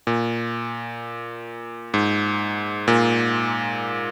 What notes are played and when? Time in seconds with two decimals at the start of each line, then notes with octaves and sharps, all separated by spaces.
0.07 A#2
1.94 G#2
2.88 A#2